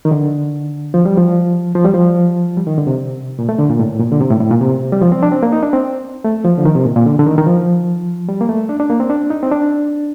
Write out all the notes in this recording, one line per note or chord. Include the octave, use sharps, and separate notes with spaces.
D#3
D3
F3
G3
F3
F3
G3
F3
G3
D#3
D3
C3
A#2
A3
D3
A#2
A2
A#2
D3
C3
A2
A2
A#2
C3
G3
F3
C4
D4
C4
A#3
D#4
D4
C4
A3
F3
D3
D#3
C3
A#2
A#2
D3
D3
D#3
D#3
F3
G3
A#3
A3
D4
D4
A#3
C4
D4
D#4
C4
D4